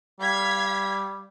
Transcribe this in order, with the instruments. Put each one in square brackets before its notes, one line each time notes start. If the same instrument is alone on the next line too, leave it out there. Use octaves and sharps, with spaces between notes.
[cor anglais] G3 [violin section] F5 G#6 B6